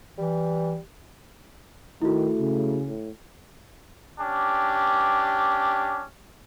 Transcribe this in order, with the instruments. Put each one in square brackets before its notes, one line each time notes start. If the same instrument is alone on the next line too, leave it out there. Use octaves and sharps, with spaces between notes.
[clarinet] E3 [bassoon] G3
[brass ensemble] D#3 [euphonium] A3 [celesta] E4 F#4
[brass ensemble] C#3
[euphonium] A2
[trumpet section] C#4 D4 G4